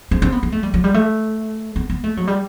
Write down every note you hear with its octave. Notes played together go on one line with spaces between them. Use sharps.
C4
C4
B3
B3
A3
G3
F#3
G3
A3
B3
B3
A3
F#3
G3